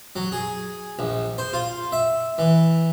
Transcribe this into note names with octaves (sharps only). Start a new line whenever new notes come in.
F#3
G#4
A#1
C5
F4
E5
E3